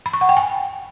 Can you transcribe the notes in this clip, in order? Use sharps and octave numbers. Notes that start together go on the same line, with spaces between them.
B5
C#6
F#5
G5
G#5